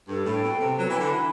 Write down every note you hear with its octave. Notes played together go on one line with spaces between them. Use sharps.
G2 A4
A2
G5
B2
A4
C3
F#3 B4
E3
D3 B5
E3